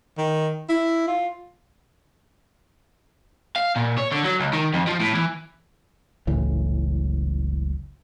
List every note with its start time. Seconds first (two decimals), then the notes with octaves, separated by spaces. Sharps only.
0.18 D#3
0.69 E4
1.07 F4
3.56 F5
3.76 A#2
3.98 C#5
4.12 D3
4.25 F#3
4.40 C#2
4.53 D#3
4.74 F2
4.87 F3
5.00 A2
5.14 E3
6.27 F#1 C#2 A2 E3